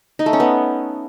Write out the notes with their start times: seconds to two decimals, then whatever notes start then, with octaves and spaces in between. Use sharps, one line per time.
0.19 D#4
0.26 A3
0.33 C#4
0.40 B3